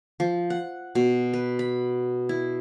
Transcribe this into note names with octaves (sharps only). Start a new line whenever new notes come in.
F3
F#5
B2
B4
B5
E4